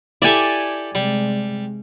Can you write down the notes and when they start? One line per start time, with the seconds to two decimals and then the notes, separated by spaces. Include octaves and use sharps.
0.22 E4 G4 A4 D5 G#5
0.95 C3 G3 G#3